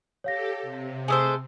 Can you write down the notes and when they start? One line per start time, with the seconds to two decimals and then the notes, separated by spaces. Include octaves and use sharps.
0.24 G4 A4 C#5 F5 A#6
0.62 C3
1.08 G#3 A3 C5 G#5 D#6 E6